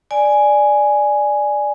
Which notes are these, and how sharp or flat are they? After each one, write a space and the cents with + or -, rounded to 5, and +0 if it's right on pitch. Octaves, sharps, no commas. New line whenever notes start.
D5 +5 G#5 +0